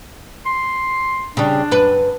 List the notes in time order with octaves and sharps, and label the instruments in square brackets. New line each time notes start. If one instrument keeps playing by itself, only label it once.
[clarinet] C6
[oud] C#3 G3 [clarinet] D4
[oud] F#2 B4